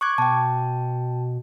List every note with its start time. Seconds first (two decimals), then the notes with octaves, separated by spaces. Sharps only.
0.01 C#6 D6 F#6 G#6
0.18 B2 G5 A5